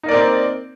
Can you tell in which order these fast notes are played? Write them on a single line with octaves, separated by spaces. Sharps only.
D#4 A#3 D5 A#4 C4